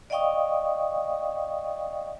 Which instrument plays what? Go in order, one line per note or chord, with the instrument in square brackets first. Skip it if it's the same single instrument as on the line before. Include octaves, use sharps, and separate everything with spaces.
[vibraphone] D5 D#5 F5 G5 C#6 D#6